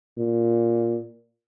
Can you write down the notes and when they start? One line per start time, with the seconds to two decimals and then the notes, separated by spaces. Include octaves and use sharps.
0.18 A#2